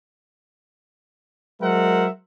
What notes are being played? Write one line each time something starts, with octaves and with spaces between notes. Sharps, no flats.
F#3 G#3 A#4 C5 E5 F#5